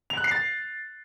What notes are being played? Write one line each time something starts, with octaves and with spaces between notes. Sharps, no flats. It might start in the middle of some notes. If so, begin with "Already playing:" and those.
F7
F#6
C7
A6